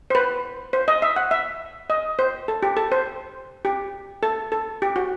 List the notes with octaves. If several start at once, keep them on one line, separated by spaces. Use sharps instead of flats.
C5
B4
C5
D#5
E5
F#5
E5
D#5
C5
A4
G4
A4
C5
G4
A4
A4
G4
F#4